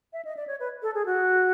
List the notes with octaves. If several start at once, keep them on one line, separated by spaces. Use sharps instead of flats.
E5
D#5
D5
C#5
B4
A4
G#4
F#4